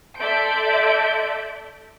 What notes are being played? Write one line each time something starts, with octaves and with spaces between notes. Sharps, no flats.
A4 D5 E5 C6 G6 D7